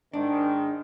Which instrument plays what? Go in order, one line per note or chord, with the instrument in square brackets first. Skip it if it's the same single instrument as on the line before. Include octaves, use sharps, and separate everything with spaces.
[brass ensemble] G#2 D#3 [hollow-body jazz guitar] D4